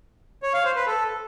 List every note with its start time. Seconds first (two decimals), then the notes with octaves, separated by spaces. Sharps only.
0.43 C#5
0.54 F5
0.65 C5
0.76 B4
0.87 A4